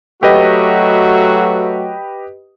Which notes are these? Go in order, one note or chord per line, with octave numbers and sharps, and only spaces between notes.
F#3 A3 F#4 G4 B4 D#5